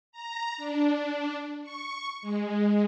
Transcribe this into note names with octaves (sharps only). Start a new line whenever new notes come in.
A#5
D4
C#6
G#3